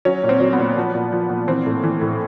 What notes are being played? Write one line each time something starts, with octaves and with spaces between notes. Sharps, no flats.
F#3 C#4
A#2
C4
F#3
B3
A#2
F3
A#2
F3
A#2
E3 C4
A2
E3
A2